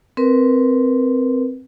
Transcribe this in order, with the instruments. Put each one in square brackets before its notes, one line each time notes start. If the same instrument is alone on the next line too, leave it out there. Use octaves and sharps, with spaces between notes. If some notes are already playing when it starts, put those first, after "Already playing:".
[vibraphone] C4 A#4 B4